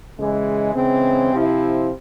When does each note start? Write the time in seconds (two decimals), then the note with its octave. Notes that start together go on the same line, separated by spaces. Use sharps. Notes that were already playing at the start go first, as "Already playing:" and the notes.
0.17 C#3 E3 G#3
0.75 C#3 E3 G#3 C4
1.33 C3 F3 C4 E4